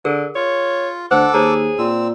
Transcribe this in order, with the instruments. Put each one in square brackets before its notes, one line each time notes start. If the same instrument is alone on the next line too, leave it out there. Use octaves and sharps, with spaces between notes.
[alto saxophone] D3 [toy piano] G#4 A#4
[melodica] F4 [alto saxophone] C#5
[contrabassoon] D2 [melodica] A4 D6 E6 [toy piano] C5 [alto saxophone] F#5
[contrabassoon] D#2 [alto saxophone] G#4 [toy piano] C5 C#5 A#5
[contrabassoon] A#2 [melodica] C4 E6